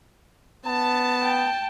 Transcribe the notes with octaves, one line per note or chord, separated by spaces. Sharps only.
B3 A5
G5